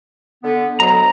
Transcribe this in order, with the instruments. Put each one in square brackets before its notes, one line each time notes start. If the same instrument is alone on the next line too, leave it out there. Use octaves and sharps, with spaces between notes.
[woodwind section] D3 B3
[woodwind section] D2 F#3 D#5 [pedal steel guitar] A#5